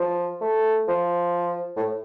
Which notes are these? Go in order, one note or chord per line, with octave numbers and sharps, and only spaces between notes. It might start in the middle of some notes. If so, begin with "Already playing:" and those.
Already playing: F3
A3
F3
A2